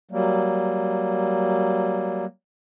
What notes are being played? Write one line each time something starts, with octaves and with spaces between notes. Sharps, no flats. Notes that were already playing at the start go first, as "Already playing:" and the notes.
F#3 G3 A#3